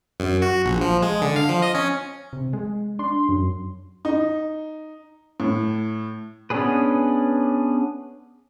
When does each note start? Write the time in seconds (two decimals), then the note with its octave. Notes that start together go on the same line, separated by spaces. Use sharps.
0.20 F#2
0.42 F#4
0.66 A#1
0.81 F3
1.03 G#3
1.22 D3
1.36 F5
1.49 F3
1.62 D#5
1.75 C#4
2.33 C3
2.53 G#3
2.99 D4 C6
3.29 F#2
4.05 D#4
5.40 A2
6.50 B3 C#4 D4 G#4 B4